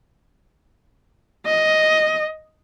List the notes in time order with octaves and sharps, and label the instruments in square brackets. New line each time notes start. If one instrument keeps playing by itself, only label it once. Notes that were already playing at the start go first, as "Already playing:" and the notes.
[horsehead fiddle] D#5